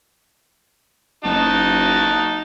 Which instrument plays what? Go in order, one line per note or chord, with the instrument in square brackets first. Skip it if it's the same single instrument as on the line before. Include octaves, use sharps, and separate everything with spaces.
[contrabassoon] F#1 [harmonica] D#4 F#4 A5